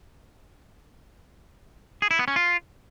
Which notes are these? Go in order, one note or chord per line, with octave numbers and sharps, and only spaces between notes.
G#4
E4
B3
C#4
F4